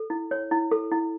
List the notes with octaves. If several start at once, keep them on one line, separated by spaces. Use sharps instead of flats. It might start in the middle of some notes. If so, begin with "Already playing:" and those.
Already playing: A4
E4
C#5
E4
A4
E4